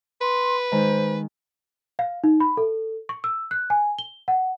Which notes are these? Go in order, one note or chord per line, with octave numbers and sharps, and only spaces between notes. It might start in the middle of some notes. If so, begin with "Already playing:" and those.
B4 C6
D#3 G#3 C5 A#5
F5
D#4
B5
A4
C#6
E6
F#6
G#5
G7
F#5